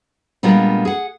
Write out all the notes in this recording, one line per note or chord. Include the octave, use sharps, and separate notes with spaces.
A#2 G3 G#3 B3 D4 F4
G#4 F#5